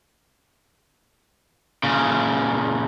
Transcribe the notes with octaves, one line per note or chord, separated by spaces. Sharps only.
A#2 C#3